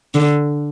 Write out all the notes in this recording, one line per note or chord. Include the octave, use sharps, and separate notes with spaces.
D3